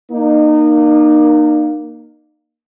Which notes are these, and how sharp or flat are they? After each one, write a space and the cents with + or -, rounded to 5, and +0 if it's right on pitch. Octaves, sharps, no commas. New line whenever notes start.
A#3 +10 D#4 -30